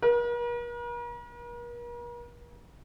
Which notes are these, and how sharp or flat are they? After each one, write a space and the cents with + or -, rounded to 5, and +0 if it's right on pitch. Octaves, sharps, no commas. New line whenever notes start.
A#4 +45